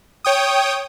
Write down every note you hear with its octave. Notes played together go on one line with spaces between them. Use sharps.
C#5 G5 D#6